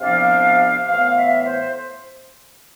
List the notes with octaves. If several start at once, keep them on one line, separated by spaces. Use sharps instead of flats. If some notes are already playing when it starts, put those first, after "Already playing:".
C2 C3 F3 B3 D4 F5
A2 E3 B3 F5
E5
C5